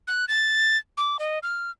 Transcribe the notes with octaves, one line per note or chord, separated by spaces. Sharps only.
F#6
A6
D6
D#5
F6